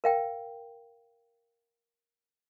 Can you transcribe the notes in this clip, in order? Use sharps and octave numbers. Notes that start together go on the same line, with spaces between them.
A#4 F5 G5